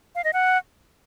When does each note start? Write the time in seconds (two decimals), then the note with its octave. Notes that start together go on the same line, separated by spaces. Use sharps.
0.15 F5
0.24 D#5
0.33 F#5